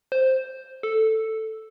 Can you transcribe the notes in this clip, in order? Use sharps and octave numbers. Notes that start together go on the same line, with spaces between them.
C5
A4